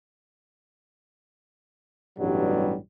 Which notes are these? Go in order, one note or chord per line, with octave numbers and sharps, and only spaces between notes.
A1 G2 B2 F#3 G3